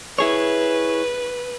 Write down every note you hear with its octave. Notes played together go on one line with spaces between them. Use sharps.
E4 G#4 B4 C#5